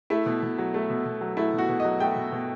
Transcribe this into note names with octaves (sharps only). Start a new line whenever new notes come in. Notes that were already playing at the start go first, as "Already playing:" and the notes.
A3 E4
B2
B2
F#3
A3
B2
B2
F#3
A3 E4
B2
F#4
B2
D#5
F#3
A3 G5
B2
B2